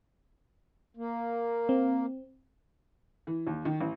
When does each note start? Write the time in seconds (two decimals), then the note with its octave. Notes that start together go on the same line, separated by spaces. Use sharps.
0.97 A#3
1.69 C4
3.27 E3
3.47 D#2
3.65 D#3
3.81 A1